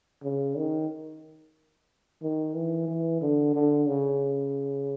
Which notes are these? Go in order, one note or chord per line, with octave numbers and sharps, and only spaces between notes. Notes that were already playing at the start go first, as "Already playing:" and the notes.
C#3
D#3
D#3
E3
E3
D3
D3
C#3